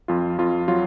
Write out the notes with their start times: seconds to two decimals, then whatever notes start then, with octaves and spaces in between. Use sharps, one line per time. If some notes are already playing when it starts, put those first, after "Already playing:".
0.08 F2 F4
0.38 F2 F4
0.68 F#3 F4